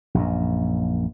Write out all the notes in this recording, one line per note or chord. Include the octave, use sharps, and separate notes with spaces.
A#1 F#2